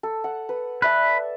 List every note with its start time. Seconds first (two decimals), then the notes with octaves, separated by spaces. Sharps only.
0.03 A4
0.24 F#5
0.49 B4
0.82 B4 D5 E5 A5